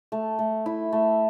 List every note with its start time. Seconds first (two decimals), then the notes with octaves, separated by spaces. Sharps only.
0.12 A3
0.39 A3
0.66 E4
0.92 A3